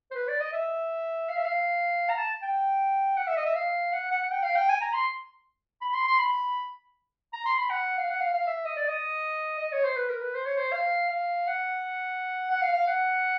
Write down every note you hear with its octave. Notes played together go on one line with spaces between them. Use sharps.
C5
B4
D5
D#5
E5
F5
E5
F5
A#5
A5
G5
F#5
E5
D#5
E5
F5
F#5
F#5
F#5
G5
F5
G5
G#5
A#5
C6
B5
C6
C6
B5
A#5
C6
B5
F#5
F5
F#5
F5
F5
E5
D#5
D5
D#5
D#5
C#5
C5
B4
A#4
B4
C5
C#5
C5
F5
F5
F#5
F#5
F5
F5
F#5